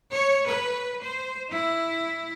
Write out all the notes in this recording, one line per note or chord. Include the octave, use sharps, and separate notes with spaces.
C#5
B4
C5
E4